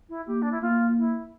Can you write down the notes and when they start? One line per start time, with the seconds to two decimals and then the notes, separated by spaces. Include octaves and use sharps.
0.09 E4
0.27 A#3 G4
0.42 D4
0.52 E4
0.62 A#3 F4
0.98 E4